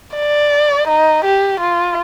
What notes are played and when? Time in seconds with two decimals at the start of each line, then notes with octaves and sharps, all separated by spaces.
0.16 D5
0.88 D#4
1.25 G4
1.60 F4